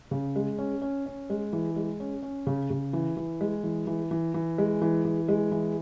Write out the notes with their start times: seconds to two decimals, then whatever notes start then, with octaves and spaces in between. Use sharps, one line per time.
0.11 C#3
0.36 G#3
0.59 C#4
0.82 C#4
1.06 C#4
1.30 G#3
1.53 E3
1.76 G#3
2.00 C#4
2.23 C#4
2.47 C#3
2.70 C#3
2.93 E3
3.17 E3
3.41 G#3
3.64 E3
3.87 E3
4.11 E3
4.34 E3
4.58 G#3
4.82 E3
5.05 E3
5.28 G#3
5.51 E3